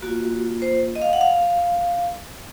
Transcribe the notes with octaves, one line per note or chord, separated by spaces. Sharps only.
A#3 F4 F#4
C5
D#5
F5
F#5
F5